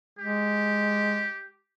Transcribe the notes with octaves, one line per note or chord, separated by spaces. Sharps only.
G#3 G4